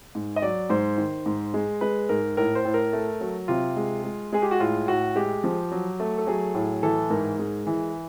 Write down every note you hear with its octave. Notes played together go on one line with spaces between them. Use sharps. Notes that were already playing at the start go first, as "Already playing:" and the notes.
G#2
D#5
F#3 D5
G#2 C5
D#3
G#2
G#3
G#3 B4
G#2 A#4
A2 A#4
C5
A2
A#4
A3
F#3
C3 F4
G#3
G#3
G#3 G#4
G4
F#4
A2 F4
A2 F#4
G#3 G4
F3
F#3
A3
A4
F#3 G#4
A2
E3 A4
G#2 A#4
G#3
E3